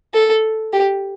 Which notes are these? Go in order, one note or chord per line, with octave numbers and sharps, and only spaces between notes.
A4
G4